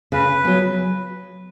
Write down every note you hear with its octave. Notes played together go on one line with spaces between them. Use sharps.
C#3 B4
F#3 B3